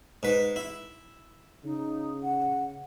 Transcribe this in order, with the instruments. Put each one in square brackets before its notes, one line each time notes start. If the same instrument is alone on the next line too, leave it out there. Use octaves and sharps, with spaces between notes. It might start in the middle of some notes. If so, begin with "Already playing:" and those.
[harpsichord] G#2 B4
E4
[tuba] C#3 [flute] D#4
[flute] F#5